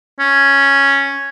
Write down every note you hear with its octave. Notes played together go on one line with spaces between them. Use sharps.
C#4